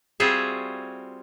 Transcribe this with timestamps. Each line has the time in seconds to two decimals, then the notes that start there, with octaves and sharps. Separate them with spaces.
0.20 G3 C4 F4 F#4 G#4 E5